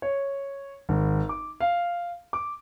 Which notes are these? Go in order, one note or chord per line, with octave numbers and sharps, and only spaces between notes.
C#5
G#1
D6
F5
D6